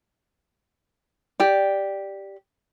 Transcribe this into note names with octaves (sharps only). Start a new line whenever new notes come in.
G4 D5